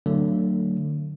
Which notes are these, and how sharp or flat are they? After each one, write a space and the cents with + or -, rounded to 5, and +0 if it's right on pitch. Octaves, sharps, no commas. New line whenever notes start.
D3 +25 F#3 +20 A3 +45